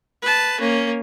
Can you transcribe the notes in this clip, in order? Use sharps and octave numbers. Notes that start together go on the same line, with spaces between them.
B4 A5
A#3 C#4